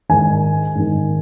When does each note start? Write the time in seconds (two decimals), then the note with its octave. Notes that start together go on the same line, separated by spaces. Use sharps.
0.09 G#2 D#3 G#5
0.75 G#2 D#3